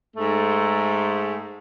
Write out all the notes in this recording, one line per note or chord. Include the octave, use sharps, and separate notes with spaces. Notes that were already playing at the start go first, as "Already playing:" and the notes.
G#2 A3